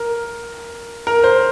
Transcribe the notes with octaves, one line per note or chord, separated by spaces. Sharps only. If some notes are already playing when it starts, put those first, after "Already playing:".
Already playing: A#4
A#4
C5